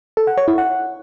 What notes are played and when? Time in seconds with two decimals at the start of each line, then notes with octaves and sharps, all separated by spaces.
0.17 A4
0.27 F#5
0.37 C#5
0.48 E4
0.58 F#5